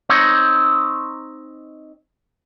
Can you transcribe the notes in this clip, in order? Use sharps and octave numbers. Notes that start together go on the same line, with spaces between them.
C4 D#4 C#5